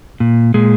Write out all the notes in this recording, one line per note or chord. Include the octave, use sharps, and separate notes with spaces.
A#2
A#2 G#3